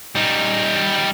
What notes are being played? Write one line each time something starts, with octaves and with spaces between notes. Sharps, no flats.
G3 D#4